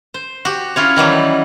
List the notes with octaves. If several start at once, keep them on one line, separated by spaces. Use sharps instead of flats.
C5
F#4 G4
C#4 E4 F4 C#5
D#3 E3 F#3 G3